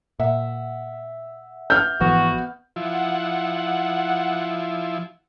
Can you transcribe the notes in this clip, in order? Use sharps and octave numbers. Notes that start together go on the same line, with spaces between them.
A#2 E5 F#5
F6 G6
G#1 E3 F3 B3 F#4
F3 E4 F#5